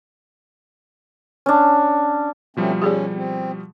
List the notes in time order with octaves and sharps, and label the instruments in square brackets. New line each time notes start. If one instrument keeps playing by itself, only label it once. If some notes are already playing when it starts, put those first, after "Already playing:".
[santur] C#4 D4
[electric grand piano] B2 F3 G3 [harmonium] A3 C4 C#4
[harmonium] C#4 [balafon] G4 G#4 D5
[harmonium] C4